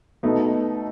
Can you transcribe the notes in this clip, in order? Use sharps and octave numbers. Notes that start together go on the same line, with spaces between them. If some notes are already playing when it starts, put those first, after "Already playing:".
B2 A3 B3 D#4